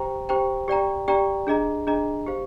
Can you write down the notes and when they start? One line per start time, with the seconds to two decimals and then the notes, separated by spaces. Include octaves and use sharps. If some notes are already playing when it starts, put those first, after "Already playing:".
Already playing: G4 C5 G5 A#5
0.29 G4 C5 G5 A#5
0.68 G4 D5 G5 A#5
1.08 G4 D5 G5 A#5
1.47 D4 G#4 D#5 A#5
1.87 D4 G#4 D#5 A#5
2.27 G4 C5 F5